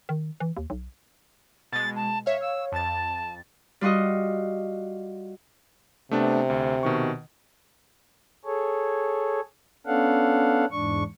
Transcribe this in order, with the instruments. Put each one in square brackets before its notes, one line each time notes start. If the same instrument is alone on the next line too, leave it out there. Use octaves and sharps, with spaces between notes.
[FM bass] D#3
E3
D#2
B1
[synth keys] B2 G#3 [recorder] A6
[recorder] A5
[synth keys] C#5 F5 [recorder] E5
[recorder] E6
[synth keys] F2 A6 [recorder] A5
[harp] G3 F4 F#4 D#5
[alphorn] C3 [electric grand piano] A3 B3 D4
[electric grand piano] D2
B2 D#3 C#6
[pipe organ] G#4 A4 C#5
B3 C#4 D4 A4 F5 F#5
E2 G#2 D4 C#6